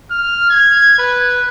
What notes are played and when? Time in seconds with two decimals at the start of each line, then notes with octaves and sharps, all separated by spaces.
0.11 F6
0.50 G#6
0.98 B4